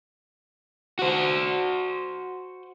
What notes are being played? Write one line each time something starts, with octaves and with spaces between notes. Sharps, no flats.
F#4 C5